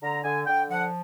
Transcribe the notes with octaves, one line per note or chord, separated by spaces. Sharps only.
D3 A#5
D3 G#5
D3 G5
F3 F#5